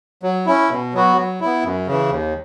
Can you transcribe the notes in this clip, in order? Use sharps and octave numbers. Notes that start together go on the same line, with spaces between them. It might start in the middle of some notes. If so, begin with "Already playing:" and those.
F#3
C#4 E4
B2
F#3 B3 F#4
F#3
B3 E4
F#2
C#3 E3
D#2